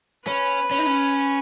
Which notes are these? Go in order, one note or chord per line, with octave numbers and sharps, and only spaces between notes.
C#4 B4
C#4
D#4
C#4